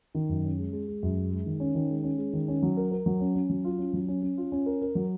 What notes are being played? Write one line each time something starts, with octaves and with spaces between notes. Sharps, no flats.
D#3
F#2
C#4
G#3
G#3
G#3
F#2
G#3
G#3
D#3
C#4
D#3
G#3
C#4
G#3
D#3
C#4
F#3
A#4
A#4
F#3
C#4
C#4
F#3
F4
C#4
F#3
C#4
C#4
F4
C#4
A#4
A#4
F#3